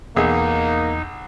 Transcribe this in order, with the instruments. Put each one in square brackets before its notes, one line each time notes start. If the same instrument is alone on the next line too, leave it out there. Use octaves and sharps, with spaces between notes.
[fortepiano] B1 G#4 [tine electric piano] E2 [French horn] A#3 [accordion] D#4